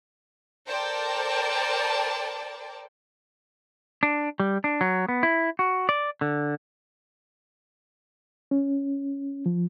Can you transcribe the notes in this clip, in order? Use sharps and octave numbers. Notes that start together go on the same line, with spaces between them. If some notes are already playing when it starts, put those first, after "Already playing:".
A4 A#4 C5 D5 G5 A5
D4
G3
D4
F#3
B3
E4
F#4
D5
D3
C#4
F3